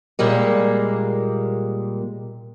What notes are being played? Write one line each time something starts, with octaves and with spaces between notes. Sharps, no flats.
A#2 G3 G#3 A#3